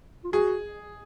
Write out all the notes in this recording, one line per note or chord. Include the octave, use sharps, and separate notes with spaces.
F4
F#4 G#4